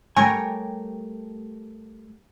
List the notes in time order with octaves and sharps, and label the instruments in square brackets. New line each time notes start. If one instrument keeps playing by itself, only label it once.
[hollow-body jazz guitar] G3 A3 G#5 [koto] G4 A#4 C#5